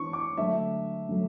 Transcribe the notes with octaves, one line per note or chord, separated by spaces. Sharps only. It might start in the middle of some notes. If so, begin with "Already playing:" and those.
Already playing: E3 B3 D4 C#6
D6
D3 F#3 A3 D4 E5
D3 F#3 A3